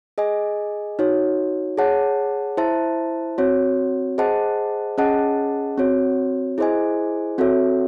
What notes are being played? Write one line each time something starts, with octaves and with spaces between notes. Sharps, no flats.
G#4 D#5 G#5
D#4 F#4 C#5
G#4 C#5 F#5 A5
E4 C5 E5 A5
C4 F#4 C#5
G#4 C5 D#5 F#5 A5
C#4 G#4 D#5 F#5 A5
C4 F#4 C#5
E4 G#4 C5 D#5 G#5
C4 F#4 A4 C#5 E5